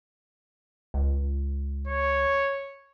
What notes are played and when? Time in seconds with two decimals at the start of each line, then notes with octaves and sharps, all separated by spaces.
0.94 C#2
1.87 C#5